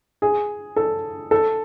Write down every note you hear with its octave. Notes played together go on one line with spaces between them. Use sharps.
G#4
A4
A4